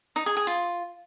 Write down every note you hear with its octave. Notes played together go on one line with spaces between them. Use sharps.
D#4
G#4
G#4
F4